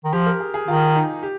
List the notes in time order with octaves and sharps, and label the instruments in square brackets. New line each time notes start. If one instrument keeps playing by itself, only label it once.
[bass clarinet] D#3
[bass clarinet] F3 [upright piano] G4
[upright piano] A#4
G#4
G#4
[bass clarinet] D#3 [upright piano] F4
[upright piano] D#4
G4